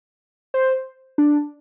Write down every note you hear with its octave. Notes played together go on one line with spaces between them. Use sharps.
C5
D4